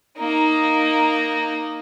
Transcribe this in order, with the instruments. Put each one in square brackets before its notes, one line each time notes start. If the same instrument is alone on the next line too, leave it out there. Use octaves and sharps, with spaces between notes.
[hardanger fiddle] A#3 D#4